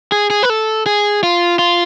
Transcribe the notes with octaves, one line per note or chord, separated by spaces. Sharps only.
G#4
G#4
B4
A4
G#4
F4
F4